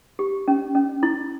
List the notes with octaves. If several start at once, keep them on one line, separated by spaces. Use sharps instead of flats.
G4
C#4
C#4
E4